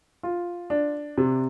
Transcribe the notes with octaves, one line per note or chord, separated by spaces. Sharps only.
F4
D4
C3